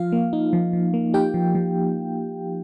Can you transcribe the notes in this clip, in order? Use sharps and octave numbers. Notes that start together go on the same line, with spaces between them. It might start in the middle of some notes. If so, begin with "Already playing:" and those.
Already playing: F3 F4 F5
A#3
D#4
F3
F3
A#3
D#4 G4 G5
F3
F3